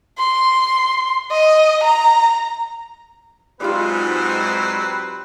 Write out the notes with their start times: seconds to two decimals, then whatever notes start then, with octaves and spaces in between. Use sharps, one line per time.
0.19 C6
1.31 D#5
1.83 A#5
3.61 G#2 F#3 C4 F4 G4 B4 D5